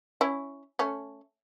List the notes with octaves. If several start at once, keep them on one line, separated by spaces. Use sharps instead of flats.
C#4 E4
A3 C#4